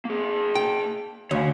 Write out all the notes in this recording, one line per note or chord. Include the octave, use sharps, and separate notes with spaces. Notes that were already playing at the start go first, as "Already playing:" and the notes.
A#3 G#4
G5
D2 C#5 F5